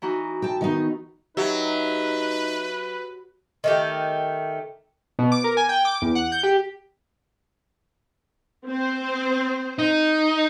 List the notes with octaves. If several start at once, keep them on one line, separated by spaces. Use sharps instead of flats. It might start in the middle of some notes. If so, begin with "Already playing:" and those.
E3 D#4 F#4
G5 A5
D#3 B3 D#4
F#3 D#4 G4 B4 E5
D#3 A3 G4
B2
D6
A#4
G#5
G5
D6
E2
F#5
G6
G4
C4 C5
D#4